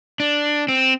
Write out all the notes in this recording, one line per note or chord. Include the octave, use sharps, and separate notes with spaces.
D4
C4